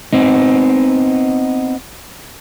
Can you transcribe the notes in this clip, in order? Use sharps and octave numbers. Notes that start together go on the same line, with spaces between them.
B3 C4 D#4